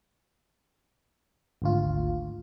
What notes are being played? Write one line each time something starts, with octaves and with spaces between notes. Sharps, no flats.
G#1 D2 F4